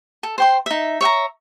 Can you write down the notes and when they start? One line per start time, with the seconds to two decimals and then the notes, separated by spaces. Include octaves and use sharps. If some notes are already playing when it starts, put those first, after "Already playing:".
0.23 A4
0.38 C5 G5 C6
0.66 D#4 E5
1.01 C#5 E5 G5 A#5